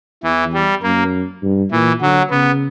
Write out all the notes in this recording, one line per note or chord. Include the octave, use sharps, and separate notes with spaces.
E2 E3
G3
F#2 A#3
G2
A#2 E3
D3 F#3
C#3 B3